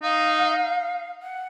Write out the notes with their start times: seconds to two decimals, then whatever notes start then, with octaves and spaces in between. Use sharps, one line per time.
0.02 D#4 F5
1.22 F#5